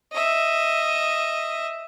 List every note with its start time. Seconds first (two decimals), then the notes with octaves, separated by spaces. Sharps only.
0.13 D#5 E5